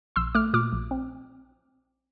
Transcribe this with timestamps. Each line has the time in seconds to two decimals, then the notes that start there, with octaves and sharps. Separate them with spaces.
0.16 A#1 C6 E6
0.35 A3 D6 F6
0.54 A#2 D6 F6
0.73 A#1
0.91 C4